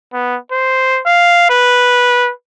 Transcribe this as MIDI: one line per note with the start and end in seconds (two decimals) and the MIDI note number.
0.13 0.37 59
0.52 1.01 72
1.06 1.46 77
1.50 2.31 71